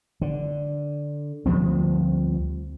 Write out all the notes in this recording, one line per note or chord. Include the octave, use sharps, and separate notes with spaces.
D3
D2 F3 G3 C4